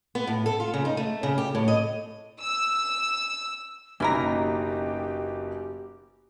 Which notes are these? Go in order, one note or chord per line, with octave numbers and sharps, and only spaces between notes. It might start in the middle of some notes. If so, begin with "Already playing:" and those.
B3
A2
A4
F4
C#3
D#4
A3
C#3
G4
A2
D#5
E6
F#1 B2 A#3 C#4 D#4 E4 G4 A#5